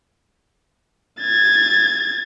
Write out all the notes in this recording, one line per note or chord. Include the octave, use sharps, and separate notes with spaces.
G#6 A6